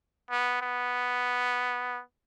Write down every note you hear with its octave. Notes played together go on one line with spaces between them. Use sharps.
B3
B3